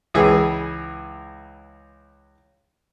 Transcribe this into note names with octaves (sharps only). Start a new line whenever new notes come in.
C#2 E3 G#4